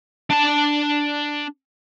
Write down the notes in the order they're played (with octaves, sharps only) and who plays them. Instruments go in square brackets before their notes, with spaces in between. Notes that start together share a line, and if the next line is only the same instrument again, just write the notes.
[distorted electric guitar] D4 A5